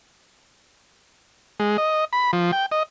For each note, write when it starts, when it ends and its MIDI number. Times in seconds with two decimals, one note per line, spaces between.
1.60 1.77 56
1.78 2.05 75
2.13 2.31 83
2.33 2.51 53
2.52 2.66 79
2.72 2.83 75